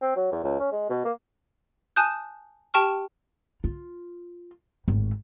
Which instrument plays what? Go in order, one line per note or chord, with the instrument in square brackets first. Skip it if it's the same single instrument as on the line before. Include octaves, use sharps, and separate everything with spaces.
[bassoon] C4
F#3
E2
C#2
C#4
G#3
B2
A#3
[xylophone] G#5 A5 D#6 F#6 G6
G4 G5 A5 C#6 F6
[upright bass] F4
G#1 A2